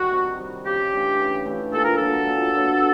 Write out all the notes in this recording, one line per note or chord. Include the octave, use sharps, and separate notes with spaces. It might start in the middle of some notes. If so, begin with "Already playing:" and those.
Already playing: D#3 G3 F#4
C3
D#3 G3
C#3 G4
E3 A3 D4
C#3
E3 A3 D4
A#2 A4
A#4
F#3 B3 D4 A4
A#2
F#3 B3 D4